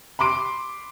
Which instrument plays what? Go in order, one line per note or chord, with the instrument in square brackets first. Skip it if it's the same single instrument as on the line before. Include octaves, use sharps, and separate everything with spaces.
[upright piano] B5 C6 D6 D7